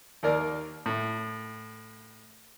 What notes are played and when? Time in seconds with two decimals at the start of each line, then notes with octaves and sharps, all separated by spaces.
0.23 D#2 A#3 A#4 D5
0.86 A2